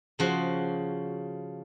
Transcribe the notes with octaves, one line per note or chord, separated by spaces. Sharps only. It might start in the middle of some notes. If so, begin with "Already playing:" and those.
C#3 F3 F#4